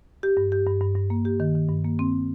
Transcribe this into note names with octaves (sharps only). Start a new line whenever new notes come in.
G4
G2
G4
G2
G2
G2
A#3
G4
D#3
D#3
G2
A#3
C4